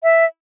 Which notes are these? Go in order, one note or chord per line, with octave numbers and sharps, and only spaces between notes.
E5